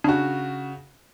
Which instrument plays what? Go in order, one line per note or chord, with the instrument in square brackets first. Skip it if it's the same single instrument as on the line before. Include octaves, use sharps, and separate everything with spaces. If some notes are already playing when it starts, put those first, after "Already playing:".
[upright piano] C#3 F#4 [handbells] D4